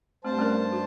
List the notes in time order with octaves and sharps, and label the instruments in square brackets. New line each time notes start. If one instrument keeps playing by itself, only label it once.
[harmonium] G2 C5 A5 [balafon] A3 C4
[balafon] A3 C#4 A#4
F#4